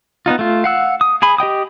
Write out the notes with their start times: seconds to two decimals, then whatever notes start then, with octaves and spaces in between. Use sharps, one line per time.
0.26 B3 D4 D#4 F4
0.39 A3 F4
0.64 F5 F#5 E6
1.01 D#6
1.22 G#4 G#5 B5
1.38 G4 D#5 G5 D#6